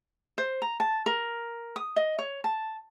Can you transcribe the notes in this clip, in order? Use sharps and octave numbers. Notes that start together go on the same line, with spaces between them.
C5
A#5
A5
A#4
D#6
D#5
C#5
A5